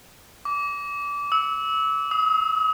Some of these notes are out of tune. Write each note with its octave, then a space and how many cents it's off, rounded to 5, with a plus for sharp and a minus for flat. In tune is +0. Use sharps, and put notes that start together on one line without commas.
D6 -25
E6 -25
D#6 +40